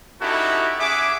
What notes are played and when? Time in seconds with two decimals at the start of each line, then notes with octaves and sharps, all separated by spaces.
0.21 C#4 D#4 E4 F#4 G4 A4
0.80 C#4 G#4 E5 F#5 D6